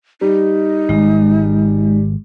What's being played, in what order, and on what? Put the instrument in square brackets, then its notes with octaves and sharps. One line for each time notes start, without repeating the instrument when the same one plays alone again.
[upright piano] G3 [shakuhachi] D#4
[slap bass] G#1 [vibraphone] G#3